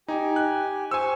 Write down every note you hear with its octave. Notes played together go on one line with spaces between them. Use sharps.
D#4 G4 G#5
F#6
C5 G#5 C#6 E6